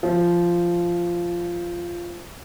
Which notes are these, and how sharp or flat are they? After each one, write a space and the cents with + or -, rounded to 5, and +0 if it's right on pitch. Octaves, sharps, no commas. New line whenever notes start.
F3 -10